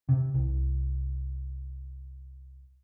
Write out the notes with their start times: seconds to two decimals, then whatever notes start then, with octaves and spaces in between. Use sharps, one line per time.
0.09 C3
0.34 C2